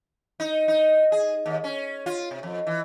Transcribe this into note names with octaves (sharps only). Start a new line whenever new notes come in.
D#4
D#4
G#4
D#2
C#4
F4
C3
F2
E3